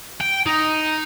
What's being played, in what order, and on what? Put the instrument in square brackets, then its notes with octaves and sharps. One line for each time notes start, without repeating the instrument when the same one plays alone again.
[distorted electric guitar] G5
D#4